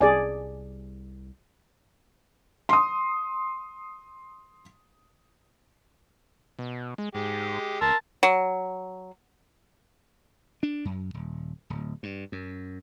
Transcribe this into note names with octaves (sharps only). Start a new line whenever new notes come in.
C2 G#4 D5 G#5
C6 D#6
B2
G#3
G#2 G#3 G4
C#2 A#4 A5 C6 E6
F#3
D4
F#2
D#1
D1
G2
F#2